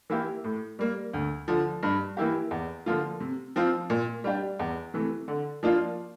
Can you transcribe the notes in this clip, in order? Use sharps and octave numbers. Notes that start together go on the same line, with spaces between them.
E3 A#3 E4 G4
A2
G3 A#3
D2
D3 F3
G2
E3 A#3 E4 G4
E2
D3 F3 A#3 F4
C3
F3 C4 F4
A#2
G3 D4 G4
E2
C3 E3 A3
D3
F3 A#3 D4 F4